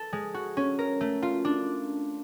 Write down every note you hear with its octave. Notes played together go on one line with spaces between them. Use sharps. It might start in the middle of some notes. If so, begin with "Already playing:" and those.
Already playing: A4
G#3
F#4
C#4
A#4
A3
F4
D4